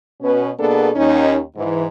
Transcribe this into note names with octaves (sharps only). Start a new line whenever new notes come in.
B2 C#4 B4
B2 A#3 B3 D4 G#4 A4
D#2 C#4 D#4
G#2 E3